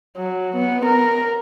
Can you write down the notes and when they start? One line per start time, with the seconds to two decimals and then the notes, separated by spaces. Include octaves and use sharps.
0.17 F#3
0.56 B3
0.86 A#4